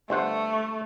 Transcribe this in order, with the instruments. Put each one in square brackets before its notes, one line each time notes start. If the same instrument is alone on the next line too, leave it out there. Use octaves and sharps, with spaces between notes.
[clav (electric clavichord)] G1 C5 F#5 [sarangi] A3